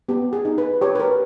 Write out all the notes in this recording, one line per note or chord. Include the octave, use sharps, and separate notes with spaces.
B3 G4
G#4
D#4
B4
G4 C#5
B4
A#4